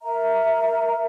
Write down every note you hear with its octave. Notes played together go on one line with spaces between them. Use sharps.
A#4 E5 A#5